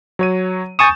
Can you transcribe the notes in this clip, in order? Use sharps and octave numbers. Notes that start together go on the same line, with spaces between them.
F#3 C#5 D#7
G#5 C#6 D#6 G6 A6 E7